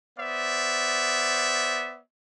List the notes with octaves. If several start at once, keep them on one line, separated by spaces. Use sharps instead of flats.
B3 C5 D5 E5